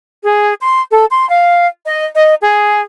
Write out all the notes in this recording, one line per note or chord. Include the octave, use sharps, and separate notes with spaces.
G#4
C6
A4
C6
F5
D#5
D#5
G#4